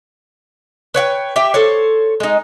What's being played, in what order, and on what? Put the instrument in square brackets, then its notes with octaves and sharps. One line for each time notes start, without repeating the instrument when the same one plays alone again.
[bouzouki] B4 C#5 F#5 G5
G4 E5 G5
A4 C5 C#5
G#3 D#4